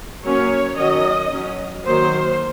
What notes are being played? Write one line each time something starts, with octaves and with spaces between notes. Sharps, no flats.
F#3 A#3 C#4 C#5
D#3 F#3 C#4 D#5
F#3 C#4
D#3 F#3 A#3 C5